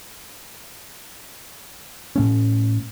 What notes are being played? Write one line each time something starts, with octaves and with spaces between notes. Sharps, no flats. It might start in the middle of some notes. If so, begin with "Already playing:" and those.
A2 A3 C#4